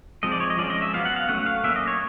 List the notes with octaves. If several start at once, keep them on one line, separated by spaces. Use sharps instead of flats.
F3 G#3 C4 D#5
D5
C#5
D#5
F3 G#3 C#4 D5
D#5
E5
F#3 B3 F5
F#5
F5
F#3 A3 C#4 F#5
F5
F#3 A#3 C#4 E5
D#5
C#5